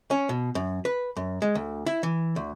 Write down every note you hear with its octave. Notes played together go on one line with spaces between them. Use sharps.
C#4
B2
F#2
B4
F#2
G#3
D2
E4
E3
D2